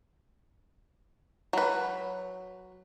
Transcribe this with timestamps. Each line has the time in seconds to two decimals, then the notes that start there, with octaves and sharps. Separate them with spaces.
1.53 F#3 B4